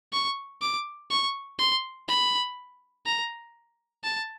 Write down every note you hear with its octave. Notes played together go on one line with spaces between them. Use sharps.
C#6
D6
C#6
C6
B5
A#5
A5